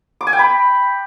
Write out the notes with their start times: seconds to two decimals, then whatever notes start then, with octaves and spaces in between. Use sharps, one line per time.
0.21 D6
0.27 G#5
0.33 G5
0.39 B5